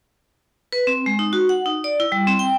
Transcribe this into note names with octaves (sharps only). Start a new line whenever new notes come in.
B4
C4
G#3
D#4
F#4
F#5
D#4
D5
E4
G3
C4
G5